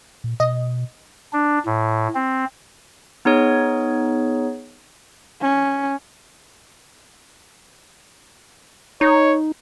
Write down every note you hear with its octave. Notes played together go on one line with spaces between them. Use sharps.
A#2
B2 D#5
D4
A2
C4
B3 D#4 G#4 C#5
C#4
D#4 C#5